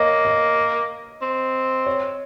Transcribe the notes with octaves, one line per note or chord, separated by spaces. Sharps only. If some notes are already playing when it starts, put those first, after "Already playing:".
Already playing: A#3 C#5 D#5
D#5
C4
C#5